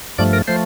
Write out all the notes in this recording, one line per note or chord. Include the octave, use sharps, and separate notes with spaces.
G2 F3 A3 D5
A#4
F3 A3 C5